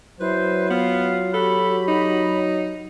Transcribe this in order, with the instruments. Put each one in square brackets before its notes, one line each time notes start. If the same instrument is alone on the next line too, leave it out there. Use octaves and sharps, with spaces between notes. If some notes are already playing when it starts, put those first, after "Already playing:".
[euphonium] F#3 [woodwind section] E4 C5 [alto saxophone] B4
[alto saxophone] B3 [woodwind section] F4 F5
[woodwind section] F#4 G4 B5 [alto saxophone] A4
[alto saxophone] D#4